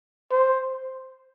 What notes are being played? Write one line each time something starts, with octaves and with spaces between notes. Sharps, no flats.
C5